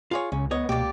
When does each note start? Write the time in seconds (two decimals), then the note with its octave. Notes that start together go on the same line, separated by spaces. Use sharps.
0.11 F4 G#4 C#5
0.32 C#2 C#3 C#4
0.51 D2 B3 C#5 D#5
0.69 C#2 B2 A#3 G4 D5 D6